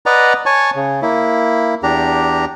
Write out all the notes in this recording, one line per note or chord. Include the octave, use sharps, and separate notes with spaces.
B4 D5 D#5 F#5 A#5
C#5 G#5 A5 C#6
C#3
A#3 E4
E2 D4 G4 A#5